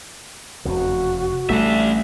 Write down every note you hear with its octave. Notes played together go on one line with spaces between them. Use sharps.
F1 E2 C#3 F#4
A1 G3 A3 D4 E5